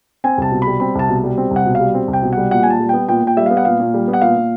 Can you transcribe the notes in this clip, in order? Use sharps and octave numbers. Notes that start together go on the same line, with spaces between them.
C4 G#5
C2 A5
B2
G3 B5
C4 B5
C2 A5
B2
G3
C4
C2
F#5
B2
G3 F5
C4
C2
G5
B2
G3 F#5
A#2 F#5
G#5
A#2 A5
G3
B3 G5
A#2 G5
A#2 G5
G3 E5
B3 F5
F#5
A#2 F5
A#2
G3
B3
F#5
A#2 F5
A#2